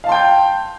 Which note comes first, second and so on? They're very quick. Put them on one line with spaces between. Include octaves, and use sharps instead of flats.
F5 A5 C6 G5 G6